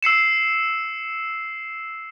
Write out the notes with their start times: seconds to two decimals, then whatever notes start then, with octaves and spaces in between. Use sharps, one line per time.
0.03 E6 C7 C#7 E7